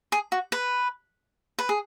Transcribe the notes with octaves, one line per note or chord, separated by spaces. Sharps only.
G#4
F#4
B4
B4
G#4